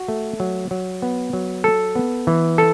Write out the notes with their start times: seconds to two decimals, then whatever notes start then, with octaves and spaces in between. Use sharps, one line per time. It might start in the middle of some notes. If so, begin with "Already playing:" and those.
Already playing: F#4
0.08 A3
0.40 F#3
0.71 F#3
1.02 B3
1.33 F#3
1.64 A4
1.95 B3
2.27 E3
2.58 A4